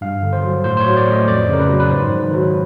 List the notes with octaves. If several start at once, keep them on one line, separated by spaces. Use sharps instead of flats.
G2 F5
D3
C5
F#3
A2 C5
C5
C#5
F#3
D5
A3
D#5
F2 D5
C#3 A#4
B4
F#3
B4
G#2 C5
D#3
F#3 B4